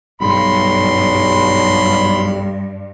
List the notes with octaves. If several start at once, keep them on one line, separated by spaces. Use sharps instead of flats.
B1 G2 G3 B5 C6